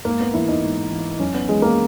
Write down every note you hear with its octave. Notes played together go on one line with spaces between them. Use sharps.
G#2 A#3
B3
E3 E4
D#4
G#2
E3
F#2 C#4
B3
E3 G#3
A#3